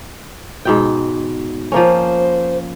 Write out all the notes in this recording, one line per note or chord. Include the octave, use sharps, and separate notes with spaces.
G#2 B2 G5
F3 A#3 C#4 C5